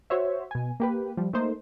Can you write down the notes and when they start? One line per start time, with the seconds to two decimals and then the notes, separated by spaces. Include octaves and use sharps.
0.10 F#4 C5 C#5 E5
0.51 B2 G#5
0.80 A#3 G4 B4
1.17 F3 G3
1.33 A3 A#3 D#4 C5